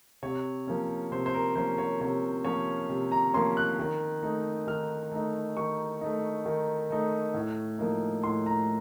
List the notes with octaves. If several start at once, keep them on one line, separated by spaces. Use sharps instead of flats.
C3 C#5
F3 A#3 C#4
C3 C5
C5
A#4
F3 A#3 C#4 C5
C#5
C3 C#5
F3 A#3 C#4 C#5
C3
A#5
F3 A#3 C#4 C6
F#6
D#3
A3 D#4
D#3 F6
A3 D#4
D#3 C#6
A3 D#4
D#3
A3 D#4
A2
F3 A#3 D#4
A2 C6
A#5